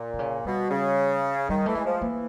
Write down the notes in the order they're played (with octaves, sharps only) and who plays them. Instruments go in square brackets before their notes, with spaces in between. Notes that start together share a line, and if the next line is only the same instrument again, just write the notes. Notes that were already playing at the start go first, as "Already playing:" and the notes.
Already playing: [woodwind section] A#2
[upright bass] C3
C#3
[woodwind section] B2 [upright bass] G3
[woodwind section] C#3
[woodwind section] D#3 [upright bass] G3
[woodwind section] E3 [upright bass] A3
[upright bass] G#3
[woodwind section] F3
[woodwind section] E3 [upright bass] A#3